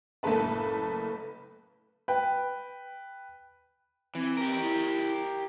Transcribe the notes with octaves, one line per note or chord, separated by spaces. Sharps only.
F#1 A2 A#3 A4 B4 A5
B4 G5
E3 C4
G4 A#4
E4